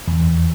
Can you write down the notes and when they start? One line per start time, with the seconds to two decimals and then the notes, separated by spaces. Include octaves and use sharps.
0.08 E2